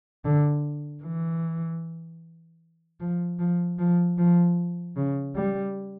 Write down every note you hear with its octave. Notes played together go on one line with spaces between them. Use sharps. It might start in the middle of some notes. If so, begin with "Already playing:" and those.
D3
E3
F3
F3
F3
F3
C#3
G3